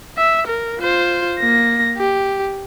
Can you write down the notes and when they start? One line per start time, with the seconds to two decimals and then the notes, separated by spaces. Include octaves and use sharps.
0.18 E5
0.47 A#4
0.80 F4 C5
1.39 A#3 A#6
1.97 G4